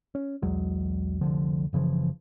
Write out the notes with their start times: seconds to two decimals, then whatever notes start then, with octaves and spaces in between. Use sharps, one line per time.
0.15 C#4
0.42 B1 E2 F#3 G#3
1.21 F1 C2 D3 F3
1.73 F#1 C#3 E3 F3